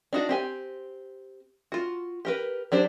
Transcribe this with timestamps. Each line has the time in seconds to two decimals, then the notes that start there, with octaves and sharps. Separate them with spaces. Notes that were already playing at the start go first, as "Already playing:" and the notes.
0.13 D4 D#4 F#4
0.29 C4 G4 G#5
1.72 F4 F#4
2.25 G4 A#4 B4
2.72 F#3 D4 G4 C5